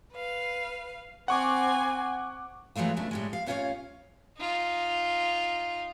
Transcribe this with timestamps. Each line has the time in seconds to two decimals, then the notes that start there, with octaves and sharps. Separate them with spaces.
0.12 B4 F5
1.28 C4 F#5 G#5 C#6 D6
2.76 E3 F#3 G#3 A3 F4
2.97 E2 C#3 A3 D4
3.11 A2 G3 G#3
3.33 F5
3.46 A2 C#4 F4 A4 C#5 F5
4.37 D#4 F4